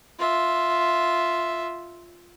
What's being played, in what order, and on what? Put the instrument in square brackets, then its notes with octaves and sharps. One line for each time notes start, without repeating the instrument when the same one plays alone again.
[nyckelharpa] F4 E5